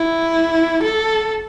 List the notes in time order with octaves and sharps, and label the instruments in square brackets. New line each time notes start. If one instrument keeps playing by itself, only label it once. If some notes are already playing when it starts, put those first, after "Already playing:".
Already playing: [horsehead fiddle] E4
A4